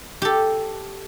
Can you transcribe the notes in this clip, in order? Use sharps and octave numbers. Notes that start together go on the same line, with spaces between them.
G4 A4